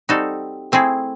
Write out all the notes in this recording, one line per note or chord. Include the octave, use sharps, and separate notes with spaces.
G3 C4 D#4 F#4 A4
A3 C4 E4 G#4